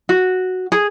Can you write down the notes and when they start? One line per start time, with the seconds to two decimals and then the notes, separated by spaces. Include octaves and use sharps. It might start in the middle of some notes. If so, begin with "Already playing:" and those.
0.09 F#4
0.72 G#4